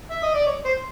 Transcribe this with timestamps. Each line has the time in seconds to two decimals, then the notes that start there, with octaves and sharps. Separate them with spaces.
0.11 E5
0.23 D#5
0.34 D5
0.46 C#5
0.65 C5